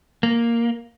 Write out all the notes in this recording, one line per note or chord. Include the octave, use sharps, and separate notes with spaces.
A#3